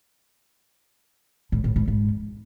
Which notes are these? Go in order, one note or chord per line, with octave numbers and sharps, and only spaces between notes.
A2
A2
A2
G#2